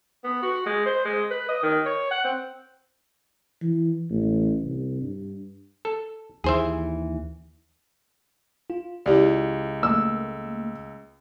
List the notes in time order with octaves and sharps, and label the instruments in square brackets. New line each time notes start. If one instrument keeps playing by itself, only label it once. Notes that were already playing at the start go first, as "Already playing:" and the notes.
[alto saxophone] B3
F#4
G#3
C5
G#3
B4
D#5
D#3
C#5
F#5
C4
[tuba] E3
A1
C2
G2
[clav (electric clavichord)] A4
[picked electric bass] D#2 E3 [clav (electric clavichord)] G#4 C5 E5
[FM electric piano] F4
[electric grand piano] C#2 [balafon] E4 G4 D5
[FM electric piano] A3 A#3 [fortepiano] E6